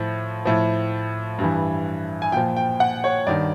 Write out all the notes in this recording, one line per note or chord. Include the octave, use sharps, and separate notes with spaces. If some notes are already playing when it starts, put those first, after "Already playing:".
Already playing: A2 F3
A2 F3
G2
E3
G#5
A#2 F3 G5
G5
F#5
C#5
G2 D#3 D5